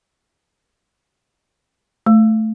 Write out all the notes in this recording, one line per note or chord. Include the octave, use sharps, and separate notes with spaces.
A3